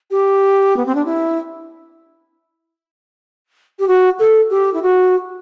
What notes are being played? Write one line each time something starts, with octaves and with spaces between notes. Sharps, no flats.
G4
B3
C4
D4
E4
G4
F#4
A4
G4
E4
F#4